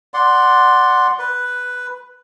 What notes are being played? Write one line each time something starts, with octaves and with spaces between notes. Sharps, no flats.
D5 F#5 C6
B4